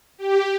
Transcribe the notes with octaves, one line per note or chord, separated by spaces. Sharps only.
G4